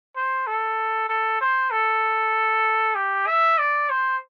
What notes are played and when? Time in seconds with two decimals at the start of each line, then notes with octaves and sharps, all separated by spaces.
0.16 C5
0.47 A4
1.09 A4
1.41 C5
1.71 A4
2.95 G4
3.27 E5
3.58 D5
3.90 C5